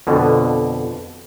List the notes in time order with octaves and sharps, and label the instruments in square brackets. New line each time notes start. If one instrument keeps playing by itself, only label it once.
[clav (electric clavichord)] F2 B2 D3